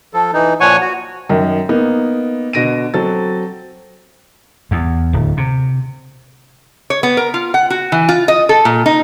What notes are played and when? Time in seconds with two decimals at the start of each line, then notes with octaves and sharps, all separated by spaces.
0.14 F3 A4
0.33 E3 D#4
0.60 A#2 F3 C#5 F#5 G#5 C#6
0.81 F#4
1.29 F#2 D#3
1.69 A#3 B3 D#4
2.53 B2 D3 A#6 D7 D#7
2.94 F#3 C4 A4 A6
4.71 E2
5.13 D1
5.37 C3
6.90 C#5
7.03 B3
7.17 A#4
7.34 F4
7.54 F#5
7.70 F#4
7.92 E3
8.09 F4
8.28 D#5
8.49 A4
8.65 A#2
8.86 D#4